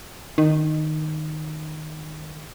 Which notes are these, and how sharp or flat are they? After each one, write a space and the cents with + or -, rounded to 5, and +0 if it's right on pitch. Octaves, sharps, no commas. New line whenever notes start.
D#3 -10